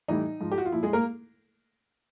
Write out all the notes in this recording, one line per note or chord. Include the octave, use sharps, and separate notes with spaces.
A2 E3 G3 D#4
G#2 F3
G4
F#4
F4
A#2 F3 E4
G#3 G#4
A#3 A#4